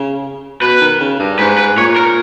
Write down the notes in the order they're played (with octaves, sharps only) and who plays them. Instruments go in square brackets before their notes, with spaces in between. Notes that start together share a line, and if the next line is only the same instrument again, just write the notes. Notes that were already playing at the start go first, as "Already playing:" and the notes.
Already playing: [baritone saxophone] C#3
[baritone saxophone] B2 [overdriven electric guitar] B4
[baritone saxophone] D#3
C#3
G2
[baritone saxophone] G#2 [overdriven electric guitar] B4
[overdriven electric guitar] B4
[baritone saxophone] A#2 [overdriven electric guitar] C#5
[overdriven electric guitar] A#4